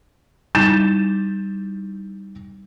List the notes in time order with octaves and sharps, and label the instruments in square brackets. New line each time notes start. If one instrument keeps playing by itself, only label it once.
[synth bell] G3 D#4 E4 [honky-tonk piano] G6 A6 E7